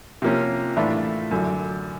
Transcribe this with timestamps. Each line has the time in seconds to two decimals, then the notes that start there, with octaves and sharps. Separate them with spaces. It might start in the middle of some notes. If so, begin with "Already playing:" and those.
0.22 C3 F3 A#3 C#4
0.77 A2 E3 A3 D4 F4 E5
1.31 F#2 D3 F#3